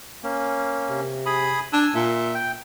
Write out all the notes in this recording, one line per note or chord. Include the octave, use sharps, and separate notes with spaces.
A#3 C#4
C3
G#4 B5 D#6
D4 G#5 E6
A#2 E5
G5